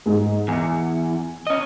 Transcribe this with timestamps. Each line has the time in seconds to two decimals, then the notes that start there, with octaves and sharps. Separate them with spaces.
0.06 G#2 G#4
0.48 E2 G#5 C#7
1.47 C#4 D#5